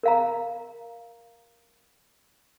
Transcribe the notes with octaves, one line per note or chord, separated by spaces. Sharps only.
A#4 F5 A#5